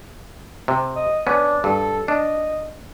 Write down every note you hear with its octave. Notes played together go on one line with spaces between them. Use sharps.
C3
D#5
B3 C#4 D4
G2 A4
D4 D#5